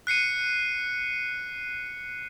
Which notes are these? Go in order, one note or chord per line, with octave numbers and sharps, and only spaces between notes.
F#6 C7 C#7 D#7